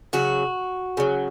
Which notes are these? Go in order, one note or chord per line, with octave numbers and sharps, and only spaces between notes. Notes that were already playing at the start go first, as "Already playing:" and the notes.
C#3 F#3 F#4
C#3 F#3